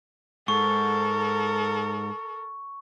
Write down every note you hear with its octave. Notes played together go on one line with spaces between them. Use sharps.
G#2 A4 A#4 C#6